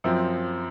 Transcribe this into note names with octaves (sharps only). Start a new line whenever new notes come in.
F#2 F3 C4